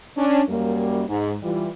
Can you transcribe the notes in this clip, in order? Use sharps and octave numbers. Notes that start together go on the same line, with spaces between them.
C#4 D4
F#2 G3 A#3
G#2
E3 G3 F4